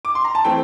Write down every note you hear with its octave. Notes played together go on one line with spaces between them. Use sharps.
D6
C6
A#5
A5
E3 A3 C4 G5